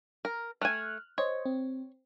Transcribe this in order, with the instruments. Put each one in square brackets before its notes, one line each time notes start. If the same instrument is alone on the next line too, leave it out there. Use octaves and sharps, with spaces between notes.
[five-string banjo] A#4
[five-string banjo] A3 G#5 [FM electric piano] F6 F#6
[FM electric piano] C5 D#5 [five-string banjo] C#5
[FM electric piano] C4